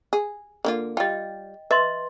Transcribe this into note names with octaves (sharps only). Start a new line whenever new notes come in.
G#4
D3 A#3 F4
G3 F4 D#5 G5
B4 D#5 E5 C6